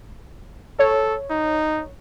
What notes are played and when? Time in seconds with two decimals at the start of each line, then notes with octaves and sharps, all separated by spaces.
0.79 A4 C#5
1.30 D#4